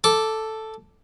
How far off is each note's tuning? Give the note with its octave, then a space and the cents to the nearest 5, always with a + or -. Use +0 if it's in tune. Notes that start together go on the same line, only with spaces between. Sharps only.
A4 +0 D6 +0